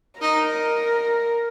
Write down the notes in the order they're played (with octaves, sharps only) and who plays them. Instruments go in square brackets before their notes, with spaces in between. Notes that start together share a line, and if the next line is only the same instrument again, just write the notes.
[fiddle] D#4 [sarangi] A#4